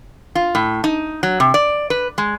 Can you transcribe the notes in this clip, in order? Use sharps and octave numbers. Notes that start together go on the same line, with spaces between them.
F4
A2
D#4
F#3
C3
D5
B4
G#3